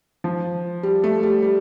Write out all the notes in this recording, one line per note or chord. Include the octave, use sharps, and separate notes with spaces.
F3
G3
A3
G3
G3